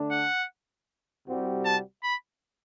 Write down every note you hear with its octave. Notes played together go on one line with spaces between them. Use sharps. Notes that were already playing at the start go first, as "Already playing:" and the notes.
Already playing: D3 A3 D4
F#5
C2 C3 G3 C4 F#4
A5
B5